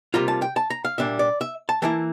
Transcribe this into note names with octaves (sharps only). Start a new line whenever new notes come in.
C3 G3 A#3 F4 A#5
A5
G5
A5
A#5
F5
A#2 G3 A#3 D4 E5
D5
E5
A5
E3 A#3 E4 A5